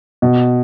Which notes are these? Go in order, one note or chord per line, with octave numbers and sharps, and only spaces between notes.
B2